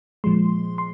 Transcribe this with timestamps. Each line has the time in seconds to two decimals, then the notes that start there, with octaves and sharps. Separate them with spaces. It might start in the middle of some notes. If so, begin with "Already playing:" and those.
0.24 A#2 F3 G#3 C6
0.78 C6